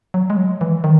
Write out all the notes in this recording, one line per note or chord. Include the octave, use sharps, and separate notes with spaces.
F#3
G#3
F#3
E3
D#3